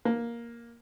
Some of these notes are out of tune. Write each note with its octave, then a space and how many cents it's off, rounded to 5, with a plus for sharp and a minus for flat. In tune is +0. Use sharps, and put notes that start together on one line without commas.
A#3 +10